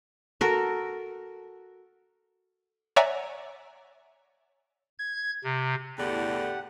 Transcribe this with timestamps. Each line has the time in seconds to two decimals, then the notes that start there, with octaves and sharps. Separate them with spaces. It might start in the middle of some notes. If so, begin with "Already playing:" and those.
0.41 F#4 A4 A#4
2.96 C#5 D5 E5 F#5 G#5 A#5
4.98 G#6
5.44 C3
5.98 E2 A2 D3 G4 F#5